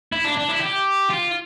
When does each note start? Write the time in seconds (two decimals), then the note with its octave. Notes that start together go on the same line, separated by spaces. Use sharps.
0.12 E4
0.24 D4
0.37 D4
0.49 E4
0.61 G4
1.10 F4